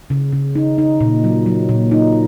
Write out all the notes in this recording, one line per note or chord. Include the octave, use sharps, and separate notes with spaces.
C#3
C#3
D#4
D#4
A#2
F#3
F#3
A#2
D#4